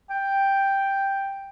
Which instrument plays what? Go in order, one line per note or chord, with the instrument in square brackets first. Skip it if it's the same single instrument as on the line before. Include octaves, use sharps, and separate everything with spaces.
[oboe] G5